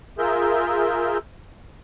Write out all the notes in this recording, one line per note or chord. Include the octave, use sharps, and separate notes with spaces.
F4 G#4 A#4 E5 G6